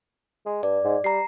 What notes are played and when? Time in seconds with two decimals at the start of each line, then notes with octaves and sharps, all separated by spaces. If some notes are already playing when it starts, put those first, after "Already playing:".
0.46 G#3
0.63 G2 D5
0.84 G#2
1.04 G3 A#5 C7